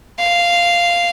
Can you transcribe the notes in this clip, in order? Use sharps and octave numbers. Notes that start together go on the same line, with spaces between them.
F5